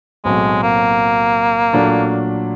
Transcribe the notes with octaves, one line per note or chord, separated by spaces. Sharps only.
B1 A2 F#3 G#3 A3 C4
A#3
A#2 F#3 A3 D4